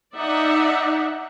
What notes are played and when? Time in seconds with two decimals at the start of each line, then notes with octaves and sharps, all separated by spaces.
0.15 D#4 D5 E5 F#5